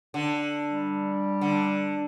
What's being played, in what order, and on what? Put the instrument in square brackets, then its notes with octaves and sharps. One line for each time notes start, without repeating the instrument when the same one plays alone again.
[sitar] D3
[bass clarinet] G3
[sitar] D3